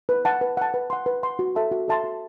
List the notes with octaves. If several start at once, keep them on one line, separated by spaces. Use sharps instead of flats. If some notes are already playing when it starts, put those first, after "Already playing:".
B4
F#5 A5
B4
F#5 A5
B4
F#5 C6
B4
F#5 C6
F#4
A4 E5 A5 C6
F#4
A4 E5 A5 C6
F#4